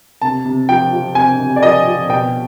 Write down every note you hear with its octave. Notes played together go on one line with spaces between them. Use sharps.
C3 A5
C3
F3 G5
F3
C3 G#5
C3
D5
F3 D#5
F3
B2 G5